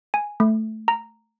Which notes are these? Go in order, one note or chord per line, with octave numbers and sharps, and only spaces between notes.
G#5
A3
A#5